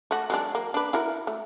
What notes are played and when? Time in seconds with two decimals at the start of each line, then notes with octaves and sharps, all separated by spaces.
0.11 A3 F#4
0.30 F#3 G#3 D4
0.55 A#3
0.74 D4 B4
0.93 E4 F#4 A#4
1.27 A3